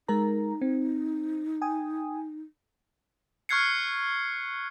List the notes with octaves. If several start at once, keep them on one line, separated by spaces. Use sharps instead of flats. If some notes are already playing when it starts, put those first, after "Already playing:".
G#3 D#4 A#4 A#5
C4
G5 G#5 D#6
C#6 F6 F#6 G#6 C7 C#7